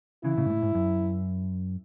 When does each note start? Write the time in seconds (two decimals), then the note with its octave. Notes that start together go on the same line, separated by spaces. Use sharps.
0.24 C#3 E3 E4
0.37 A2 C#3
0.45 G#2
0.50 A2
0.62 G#2
0.75 F#2